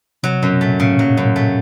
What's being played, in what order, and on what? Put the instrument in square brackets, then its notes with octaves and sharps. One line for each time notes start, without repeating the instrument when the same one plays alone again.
[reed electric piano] C3 [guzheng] F#3
[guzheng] F#2 [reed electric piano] B2
[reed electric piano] A#2 [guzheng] A3
[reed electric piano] A2 [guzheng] C#3
[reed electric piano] A2
[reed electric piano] A#2 [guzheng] F#3
[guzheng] F#2
[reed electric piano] A2
[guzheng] A3